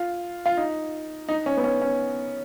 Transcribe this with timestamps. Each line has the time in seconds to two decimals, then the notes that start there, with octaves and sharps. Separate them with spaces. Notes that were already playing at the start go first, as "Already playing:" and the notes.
Already playing: F4
0.46 F4
0.57 D#4
1.29 D#4
1.46 C#4
1.57 B3
1.64 C#4
1.82 C#4